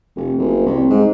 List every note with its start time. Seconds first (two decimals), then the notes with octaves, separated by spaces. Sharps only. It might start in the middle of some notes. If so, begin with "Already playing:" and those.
0.16 F1
0.38 F#1
0.66 C2
0.90 G#2